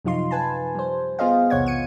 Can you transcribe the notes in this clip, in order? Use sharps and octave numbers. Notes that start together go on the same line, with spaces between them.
F#2 C3 F3 D#4 F4 C6
B4 G#5 A5
G3 C5
B3 F4 G#4 C5 D#5 F5
B1 E2 C3 C#5 F#5 G#6
C#7 D#7